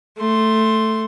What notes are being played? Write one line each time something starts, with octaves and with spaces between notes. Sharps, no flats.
A3 C6